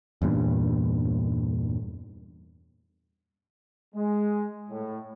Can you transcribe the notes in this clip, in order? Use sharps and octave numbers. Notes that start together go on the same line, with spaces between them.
E2 G2 A#2
G#3
A2